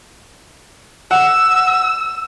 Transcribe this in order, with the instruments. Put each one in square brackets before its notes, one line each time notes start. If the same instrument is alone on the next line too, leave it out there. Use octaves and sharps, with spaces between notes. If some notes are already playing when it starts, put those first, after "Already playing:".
[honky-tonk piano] F#5 [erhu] E6